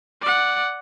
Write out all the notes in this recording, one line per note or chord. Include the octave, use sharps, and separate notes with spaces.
D5 F#5